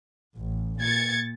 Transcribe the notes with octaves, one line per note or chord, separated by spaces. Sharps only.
A1
A#2 G#6 A6 C#7